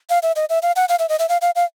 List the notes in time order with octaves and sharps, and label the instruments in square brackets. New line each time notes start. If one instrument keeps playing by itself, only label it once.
[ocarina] F5
E5
D#5
E5
F5
F#5
F5
E5
D#5
E5
F5
F5
F5